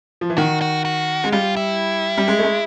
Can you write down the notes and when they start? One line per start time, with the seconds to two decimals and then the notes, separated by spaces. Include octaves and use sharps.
0.21 F3
0.30 E3
0.38 D#3 F#4
0.61 F#4
0.85 F#4
1.24 G#3
1.32 G3 F4
1.56 E4
2.17 G3
2.28 G#3
2.39 A3
2.44 G#3